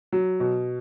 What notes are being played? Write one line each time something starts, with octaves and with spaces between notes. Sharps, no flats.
F#3
B2